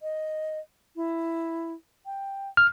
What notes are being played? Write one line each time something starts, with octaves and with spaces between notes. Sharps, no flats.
D#5
E4
G5
F6